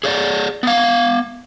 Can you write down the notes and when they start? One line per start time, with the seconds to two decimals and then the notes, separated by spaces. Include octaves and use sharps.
0.04 G#4 C#5 D5
0.63 B3 F5